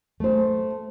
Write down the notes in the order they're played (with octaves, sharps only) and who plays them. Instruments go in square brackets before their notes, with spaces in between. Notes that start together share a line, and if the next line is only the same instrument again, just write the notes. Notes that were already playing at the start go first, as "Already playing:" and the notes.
[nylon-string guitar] A3 C5